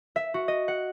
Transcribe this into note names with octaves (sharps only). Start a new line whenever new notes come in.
E5
F#4
D#5
F#5